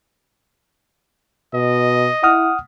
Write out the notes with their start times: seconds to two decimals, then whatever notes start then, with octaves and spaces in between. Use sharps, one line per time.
1.54 B2 D#5
2.23 E4 F#5 D#6 F6